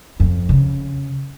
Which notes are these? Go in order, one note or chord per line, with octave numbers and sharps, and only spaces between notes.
F2
C#3